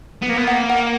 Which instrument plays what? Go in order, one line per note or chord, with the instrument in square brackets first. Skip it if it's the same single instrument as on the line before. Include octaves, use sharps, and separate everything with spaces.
[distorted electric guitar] B3
A#3
B3
[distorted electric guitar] A#3 [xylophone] F#5
[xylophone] F#5